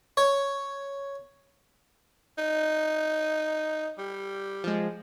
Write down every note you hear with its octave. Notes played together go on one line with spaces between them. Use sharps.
C#5
D#4
G3
F3 G#3